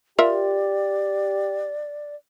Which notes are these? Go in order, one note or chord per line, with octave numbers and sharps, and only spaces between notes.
F4 G4 A#4 D5 E5